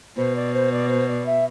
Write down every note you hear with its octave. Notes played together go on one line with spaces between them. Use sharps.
B2 C5
D5
C5
D5
C5
D5
E5